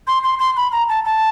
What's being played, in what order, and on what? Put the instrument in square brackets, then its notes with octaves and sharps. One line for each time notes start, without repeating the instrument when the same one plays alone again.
[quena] C6
C6
C6
B5
A#5
A5
A5